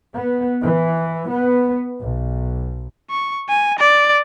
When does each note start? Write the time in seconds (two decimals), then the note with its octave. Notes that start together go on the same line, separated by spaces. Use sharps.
0.13 B3
0.63 E3
1.29 B3
2.01 B1
3.10 C#6
3.49 G#5
3.79 D5